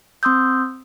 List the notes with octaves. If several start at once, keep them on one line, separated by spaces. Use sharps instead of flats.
C4 C6 D#6 E6 G6